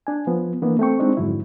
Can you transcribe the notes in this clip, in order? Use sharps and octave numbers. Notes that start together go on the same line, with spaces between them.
D4 G#5
F3 B3
E3 A#3 B3 D4
A3 C4 G5 C#6
G#3 C4 D4 D#4
F2 G#2 D3 F#3 E4